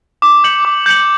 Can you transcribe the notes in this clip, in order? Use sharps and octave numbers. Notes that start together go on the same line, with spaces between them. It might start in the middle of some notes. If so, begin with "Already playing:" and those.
D6
G6 C#7 F#7
D6
G6 C#7 F#7